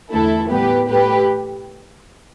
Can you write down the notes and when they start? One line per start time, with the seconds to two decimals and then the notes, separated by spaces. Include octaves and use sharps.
0.12 E2 D3 A3 E4 A4
0.51 A2 E3 G3 B3 G4 B4
0.89 A2 A3 G4 B4